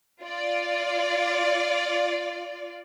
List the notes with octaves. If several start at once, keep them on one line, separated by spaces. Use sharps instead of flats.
F4 D5